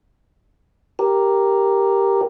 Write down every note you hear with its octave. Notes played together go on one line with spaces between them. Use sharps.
G4 A#4